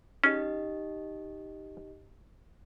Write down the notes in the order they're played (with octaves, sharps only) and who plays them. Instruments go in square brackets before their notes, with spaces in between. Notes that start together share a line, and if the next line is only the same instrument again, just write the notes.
[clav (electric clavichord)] C#4 G#4 [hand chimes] D#4 G4 D#5